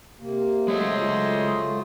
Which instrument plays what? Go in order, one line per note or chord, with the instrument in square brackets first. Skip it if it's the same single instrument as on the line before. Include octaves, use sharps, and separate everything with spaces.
[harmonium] C3 A#3
[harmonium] F#3 A3 [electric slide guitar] G#3 C#5 [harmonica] G#4 C5 D#5
[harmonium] F#3 A3 F4